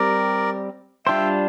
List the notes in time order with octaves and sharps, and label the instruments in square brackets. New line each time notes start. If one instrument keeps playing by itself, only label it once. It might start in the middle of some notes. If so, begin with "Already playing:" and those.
Already playing: [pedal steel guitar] G3 C4 G4 [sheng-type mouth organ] A#4 D5
[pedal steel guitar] G3 D4 F4 C5 [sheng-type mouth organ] E5 G5